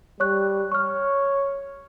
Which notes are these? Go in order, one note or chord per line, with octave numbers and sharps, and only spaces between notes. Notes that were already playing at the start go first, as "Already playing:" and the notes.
G3 C#5 C#6 F#6
C#5 C#6 F6